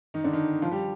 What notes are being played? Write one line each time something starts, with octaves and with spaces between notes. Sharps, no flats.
D#3 D#4
D3 D4
D#3 D#4
F3 F4
G3 G4